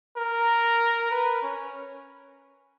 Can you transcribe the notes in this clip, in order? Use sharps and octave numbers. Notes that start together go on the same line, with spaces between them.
A#4
B4
C#4